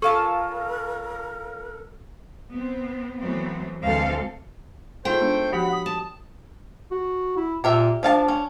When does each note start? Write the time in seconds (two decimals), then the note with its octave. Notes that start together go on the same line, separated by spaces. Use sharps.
0.02 C#4 F4 A4 A#4 A5 C#6
2.51 B3 C4
3.19 E3 F#3 A3 B3 C4
3.82 D2 E3 G#3 C4 A4 F5
5.05 A3 D#4 F4 G#4 C5 G5
5.20 G#3 B3 D4
5.52 F3 F#4 G4 F#5 B5
5.72 D#6
5.86 A5
6.91 F#4
7.37 E4
7.64 A#2 G4 A#4 E5
8.03 F3 D4 F5 A5
8.28 C#4